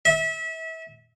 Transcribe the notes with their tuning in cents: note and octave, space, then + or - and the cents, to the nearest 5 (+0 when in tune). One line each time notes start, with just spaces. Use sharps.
E5 -30